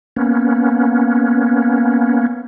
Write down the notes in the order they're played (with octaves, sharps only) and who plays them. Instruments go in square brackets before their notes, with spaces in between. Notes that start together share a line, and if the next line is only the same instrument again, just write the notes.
[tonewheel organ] A#3 B3 C#4